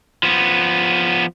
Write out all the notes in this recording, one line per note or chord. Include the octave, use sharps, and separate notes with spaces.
F3 B3